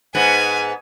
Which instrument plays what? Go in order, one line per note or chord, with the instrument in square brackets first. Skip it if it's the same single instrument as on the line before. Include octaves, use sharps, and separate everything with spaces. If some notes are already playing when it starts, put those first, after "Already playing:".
[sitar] G#2 B3 [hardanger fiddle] G#5